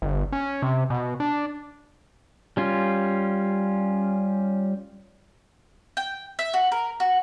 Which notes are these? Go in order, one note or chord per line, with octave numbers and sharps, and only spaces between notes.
G1
C#4
C3
B2
D4
G3 C#4 F4
G5
E5
F#4
A#4
F#4